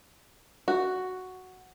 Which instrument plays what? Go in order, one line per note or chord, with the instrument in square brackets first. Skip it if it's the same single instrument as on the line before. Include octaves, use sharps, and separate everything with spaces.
[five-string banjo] F#4